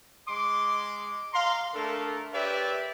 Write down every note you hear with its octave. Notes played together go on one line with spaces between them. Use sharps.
G#3 C6 D6
F5 A#5 C6
A3 D4 A4 A#4
G4 B4 C#5 D5 E5